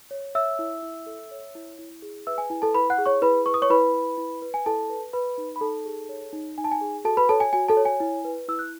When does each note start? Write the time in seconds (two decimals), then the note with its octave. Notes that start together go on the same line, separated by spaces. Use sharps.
0.11 C#5
0.35 C#5 E5 E6
0.59 E4
0.83 E4
1.06 A4
1.31 C#5
1.55 E4
1.78 E4
2.02 G#4
2.27 B4 E5 E6
2.38 G#5
2.50 E4 G#5
2.62 A4 A5
2.74 E4 B4 B5
2.90 F#5 F#6
2.98 G#4
3.06 C#5 C#6
3.22 E4 B4 B5
3.46 B4 C#6
3.54 D#6
3.62 C#5 C#6
3.70 E4 B4 B5
3.94 B4
4.18 E4
4.42 B4
4.54 G#5
4.66 E4 A4 A5
4.90 B4
5.13 B4 B5
5.38 D#4
5.56 B5
5.61 D#4 A4 A5
5.85 G#4
6.09 C#5
6.33 D#4
6.58 D#4 G#5
6.64 A5
6.71 G#5
6.81 G#4
7.04 F#4 A4 A5
7.17 B4 B5
7.29 A4 C#5 A5
7.40 G#5
7.53 F#4 G#5
7.68 A4 A5
7.77 C#5
7.85 G#5
8.00 E4
8.25 B4
8.48 E4 E6
8.59 F#6